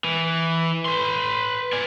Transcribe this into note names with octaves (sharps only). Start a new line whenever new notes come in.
E3
B4 C6
D5 G#5